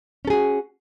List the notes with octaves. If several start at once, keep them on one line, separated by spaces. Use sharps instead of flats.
C#4 F#4 G#4 A4